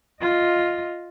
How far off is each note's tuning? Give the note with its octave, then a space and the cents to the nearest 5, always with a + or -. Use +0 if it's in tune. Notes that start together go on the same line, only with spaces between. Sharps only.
F4 +0 D#5 +0